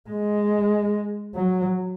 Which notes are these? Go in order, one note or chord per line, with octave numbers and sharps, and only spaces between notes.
G#3
F#3